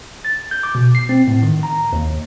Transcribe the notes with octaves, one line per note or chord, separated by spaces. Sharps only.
A6
G6
D6
B2
C7
C4
A2
D#3
A#5
D#2